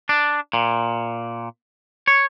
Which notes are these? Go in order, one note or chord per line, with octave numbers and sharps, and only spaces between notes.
D4
A#2
C#5